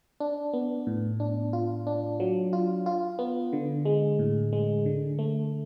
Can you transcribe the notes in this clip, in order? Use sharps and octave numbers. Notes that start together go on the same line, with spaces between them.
D4
B3
A2
D4
F4
D4
F#3
F4
F4
B3
D3
G#3
A2
G#3
D3
A3